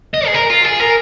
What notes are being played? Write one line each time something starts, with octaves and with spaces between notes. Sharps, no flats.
D#5
G#4
A#4
F4
G#4
A#4